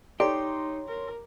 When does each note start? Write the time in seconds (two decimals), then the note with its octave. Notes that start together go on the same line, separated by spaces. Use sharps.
0.20 D#4 G4 A4 C#5 D5 A#5 C6
0.88 A#4